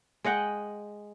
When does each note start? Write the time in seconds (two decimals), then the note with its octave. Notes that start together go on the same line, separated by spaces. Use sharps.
0.24 G#3 D#5 F#5 G5